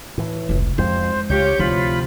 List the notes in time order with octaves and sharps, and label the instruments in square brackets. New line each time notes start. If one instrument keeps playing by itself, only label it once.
[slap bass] A2 E3
[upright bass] F1 C#2
[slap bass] F2 [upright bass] G#3 [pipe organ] C5
[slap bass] C#2 [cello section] F4 G4 C#5 [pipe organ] G6
[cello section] D2 [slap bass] C3 F3 [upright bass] E4 [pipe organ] F4 B5